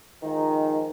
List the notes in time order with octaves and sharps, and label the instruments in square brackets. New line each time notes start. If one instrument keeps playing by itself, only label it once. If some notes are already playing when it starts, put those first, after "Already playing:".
[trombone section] D#3 F3 G#3 D#4